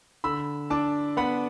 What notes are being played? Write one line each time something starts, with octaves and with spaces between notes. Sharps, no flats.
D3 B5 E6
D4 A5 D6
B3 F#5 B5